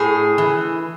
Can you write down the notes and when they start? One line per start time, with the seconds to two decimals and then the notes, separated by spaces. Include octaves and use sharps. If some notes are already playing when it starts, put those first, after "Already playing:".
Already playing: A2 G#4
0.38 E3